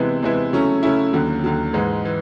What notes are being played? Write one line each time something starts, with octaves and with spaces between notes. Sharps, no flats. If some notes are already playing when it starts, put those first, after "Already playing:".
Already playing: C3 E3 G#3 B3 E4
C3 E3 G#3 B3 E4
C#3 F#3 A3 C#4 E4
C#3 F#3 A3 C#4 E4
D#2 D3 F#3
D#2 D3 F#3
G#2 E3 G#3
E3